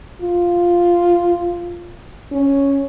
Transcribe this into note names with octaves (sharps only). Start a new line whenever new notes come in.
F4
C#4